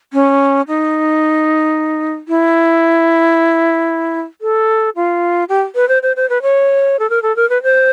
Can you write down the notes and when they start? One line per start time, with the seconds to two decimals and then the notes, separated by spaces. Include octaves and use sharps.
0.13 C#4
0.68 D#4
2.28 E4
4.41 A4
4.96 F4
5.49 G4
5.75 B4
5.89 C5
6.03 C5
6.16 C5
6.29 B4
6.42 C#5
6.99 A4
7.10 A#4
7.22 A4
7.36 A#4
7.50 B4
7.63 C5